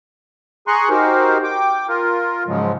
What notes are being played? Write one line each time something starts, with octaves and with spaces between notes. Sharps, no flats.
G#4 G#5 A#5 C6 C#6 F#6
D#4 F#4 G4 A#4 C5
G5 D6
F4 A#4
G#2 C#3 F3 F#3 G#3